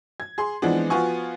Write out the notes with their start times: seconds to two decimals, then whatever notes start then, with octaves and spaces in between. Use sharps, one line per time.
0.20 G#6
0.38 G#4 C6
0.62 E3 F3 G#3 B3 C4 D4
0.90 F3 B3 F4 F#4 G#5 C#6